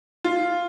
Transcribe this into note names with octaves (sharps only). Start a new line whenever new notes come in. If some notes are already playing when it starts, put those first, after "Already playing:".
F4